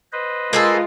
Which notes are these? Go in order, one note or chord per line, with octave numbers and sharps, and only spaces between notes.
B4 C5 D#5
G#3 A#3 F4 G#4 A4